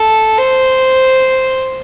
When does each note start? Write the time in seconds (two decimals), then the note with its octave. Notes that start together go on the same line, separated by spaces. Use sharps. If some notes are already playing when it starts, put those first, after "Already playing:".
Already playing: A4
0.38 C5